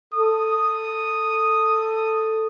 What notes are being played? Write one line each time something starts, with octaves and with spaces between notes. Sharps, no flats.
A4 D#6